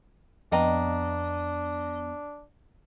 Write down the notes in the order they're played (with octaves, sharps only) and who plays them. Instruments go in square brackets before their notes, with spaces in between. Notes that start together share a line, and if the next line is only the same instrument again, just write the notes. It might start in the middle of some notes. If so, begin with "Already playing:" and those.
[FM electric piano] F2 B3 [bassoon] D4 [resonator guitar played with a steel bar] D#5 [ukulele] F5 G5 A#5